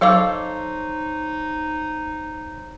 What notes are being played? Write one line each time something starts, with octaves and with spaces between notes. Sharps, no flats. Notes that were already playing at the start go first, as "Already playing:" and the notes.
F#3 D#4 A4 C5 C#5 F5 C6 D6